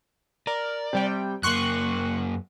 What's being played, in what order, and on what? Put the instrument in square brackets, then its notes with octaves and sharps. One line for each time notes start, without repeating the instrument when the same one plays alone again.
[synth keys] A#4 [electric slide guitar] D5
[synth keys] C3 G3 G5
[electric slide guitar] F#2 A#3 [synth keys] C6 C#6 F#6